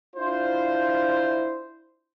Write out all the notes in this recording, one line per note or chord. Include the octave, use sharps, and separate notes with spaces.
D4 E4 F4 C5